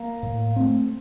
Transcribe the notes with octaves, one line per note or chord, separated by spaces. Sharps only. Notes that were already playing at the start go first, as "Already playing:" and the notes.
Already playing: A#3
A2
A3 C4